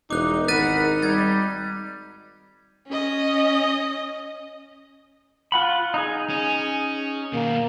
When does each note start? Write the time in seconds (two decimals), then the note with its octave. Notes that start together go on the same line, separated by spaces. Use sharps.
0.11 E1 D#4 D6 F#6
0.48 G#1 A#4 F#5 B5 F#6 A6 D#7
1.02 G3 G#6 A6
2.88 C#4 D#5
5.52 F4 F#5 B5
5.94 D#4 G#4
6.30 C#4
7.33 B2 D#3 A#3